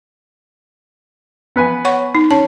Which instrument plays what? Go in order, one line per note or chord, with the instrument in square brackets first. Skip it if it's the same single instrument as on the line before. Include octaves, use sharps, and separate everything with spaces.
[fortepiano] B3 B4 G#5
[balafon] C#5 F#5 C#6
D#4
[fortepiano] C#4 [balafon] A5